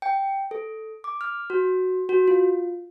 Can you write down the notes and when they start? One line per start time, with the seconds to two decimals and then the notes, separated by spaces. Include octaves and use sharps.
0.02 G5
0.51 A4
1.04 D6
1.21 F6
1.50 F#4
2.09 F#4
2.28 F4